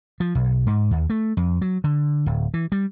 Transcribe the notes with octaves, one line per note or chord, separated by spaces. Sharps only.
F3
B1
G#2
D#2
A3
F2
F#3
D3
D1
E3
G3